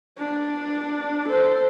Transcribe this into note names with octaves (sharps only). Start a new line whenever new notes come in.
D4
A4 C5